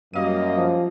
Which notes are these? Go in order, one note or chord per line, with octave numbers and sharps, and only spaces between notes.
F#2 G3 A#3 D#5 F5 D#7
F3